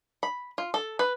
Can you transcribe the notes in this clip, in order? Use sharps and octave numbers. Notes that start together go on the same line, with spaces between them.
B5
F4
A4
B4